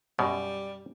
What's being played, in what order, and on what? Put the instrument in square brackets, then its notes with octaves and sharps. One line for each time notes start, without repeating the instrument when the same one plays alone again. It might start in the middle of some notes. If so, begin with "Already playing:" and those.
[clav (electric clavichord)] F#2 B2 [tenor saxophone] G3